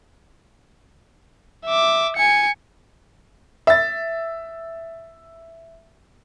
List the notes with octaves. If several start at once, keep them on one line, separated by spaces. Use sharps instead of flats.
E5 D6
G#5 C#7
E5 A6